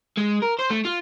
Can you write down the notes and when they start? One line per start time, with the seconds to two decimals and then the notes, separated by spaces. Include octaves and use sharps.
0.17 G#3
0.42 A#4
0.59 C5
0.70 A3
0.85 F4